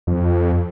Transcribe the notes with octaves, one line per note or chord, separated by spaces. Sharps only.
F2